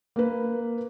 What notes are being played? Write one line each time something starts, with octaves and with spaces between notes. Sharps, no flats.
A#3 B4